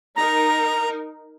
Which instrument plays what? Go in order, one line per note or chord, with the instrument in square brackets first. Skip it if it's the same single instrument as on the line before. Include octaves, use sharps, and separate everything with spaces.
[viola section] D#4 A#4 [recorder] A#5